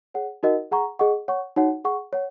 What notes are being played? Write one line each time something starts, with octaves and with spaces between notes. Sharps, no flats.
G#4 C#5 F#5
D#4 F#4 A#4 D#5 F#5
G#4 F#5 A#5 C#6
G#4 D#5 F#5 C#6
C#5 F#5 C#6
D#4 F#4 C#5 F#5
G#4 F#5 C#6
C#5 F#5